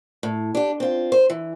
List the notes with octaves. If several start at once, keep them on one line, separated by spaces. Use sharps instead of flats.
A2
D4 G4
C4 F4
C5
E3